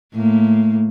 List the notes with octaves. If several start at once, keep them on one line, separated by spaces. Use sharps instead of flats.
A2 A#3